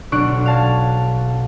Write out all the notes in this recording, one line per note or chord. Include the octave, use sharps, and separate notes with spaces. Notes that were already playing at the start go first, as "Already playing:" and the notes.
B1 D4 C#6 F#6 D7
F5 A5 G#6